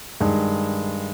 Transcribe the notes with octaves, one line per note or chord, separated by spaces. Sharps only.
G2 D#3 G#3